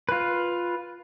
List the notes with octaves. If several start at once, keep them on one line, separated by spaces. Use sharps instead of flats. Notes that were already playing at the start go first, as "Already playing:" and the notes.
F4 B4